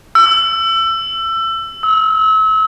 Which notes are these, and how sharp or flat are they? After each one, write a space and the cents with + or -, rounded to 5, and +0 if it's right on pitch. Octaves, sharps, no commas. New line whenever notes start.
E6 +25
E6 -35